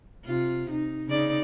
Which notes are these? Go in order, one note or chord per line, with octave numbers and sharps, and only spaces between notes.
C3 F4
D#4
C#3 D#4 D5